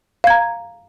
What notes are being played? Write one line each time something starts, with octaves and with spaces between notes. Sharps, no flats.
F5 A#5 G#6